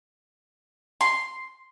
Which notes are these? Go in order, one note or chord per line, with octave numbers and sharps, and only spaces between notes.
C6